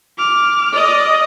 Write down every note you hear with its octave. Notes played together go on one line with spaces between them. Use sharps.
D6 F6
D5 D#5